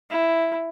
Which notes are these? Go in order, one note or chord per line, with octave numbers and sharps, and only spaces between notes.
E4